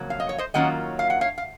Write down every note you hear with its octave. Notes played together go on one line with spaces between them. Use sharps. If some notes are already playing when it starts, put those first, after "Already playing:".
Already playing: F2 C#3 F#3 A#3
F5
D#5
C#5
C5 D#5
D#3 F#3 A#3 C#4 F4 D#5 F#5
F5
F#5
C#5 F5
F5